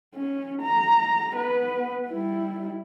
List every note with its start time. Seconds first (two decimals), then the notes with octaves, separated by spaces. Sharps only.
0.15 C#4
0.62 A#5
1.34 B3 B4
2.08 G3 E4